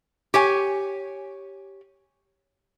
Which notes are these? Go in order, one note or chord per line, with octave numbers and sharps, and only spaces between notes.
G4 C#5 G#5